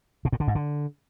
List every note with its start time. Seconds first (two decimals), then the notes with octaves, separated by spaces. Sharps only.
0.25 B2
0.32 A2
0.40 D3
0.48 G#2
0.55 D3